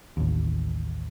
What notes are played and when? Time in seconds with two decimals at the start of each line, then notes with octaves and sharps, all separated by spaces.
0.17 A1 D#2